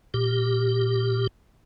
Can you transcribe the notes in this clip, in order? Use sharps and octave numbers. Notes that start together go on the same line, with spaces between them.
A#2 G4